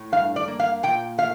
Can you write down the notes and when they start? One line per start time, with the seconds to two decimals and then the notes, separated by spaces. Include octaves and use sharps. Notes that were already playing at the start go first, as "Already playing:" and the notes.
Already playing: A2
0.12 G2 F5
0.36 D5
0.48 A#3
0.60 F5
0.83 A#2 G5
1.18 A3 F5